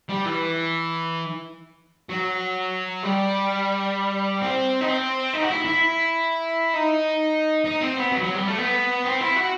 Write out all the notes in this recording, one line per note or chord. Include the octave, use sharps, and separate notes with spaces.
G3
E3
F#3
G3
C4
D#4
C4
D#4
F#4
E4
E4
D#4
D#4
C4
B3
F#3
F#3
G3
A3
B3
C4
E4
F#4